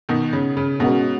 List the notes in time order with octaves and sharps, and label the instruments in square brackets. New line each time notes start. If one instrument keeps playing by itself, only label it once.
[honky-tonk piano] B2 D#3
C#3
C#3
[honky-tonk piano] B2 [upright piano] G#3 C#4 F#4 A#4